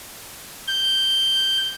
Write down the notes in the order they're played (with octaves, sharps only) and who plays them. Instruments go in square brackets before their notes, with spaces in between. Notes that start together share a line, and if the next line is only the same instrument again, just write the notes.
[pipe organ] G6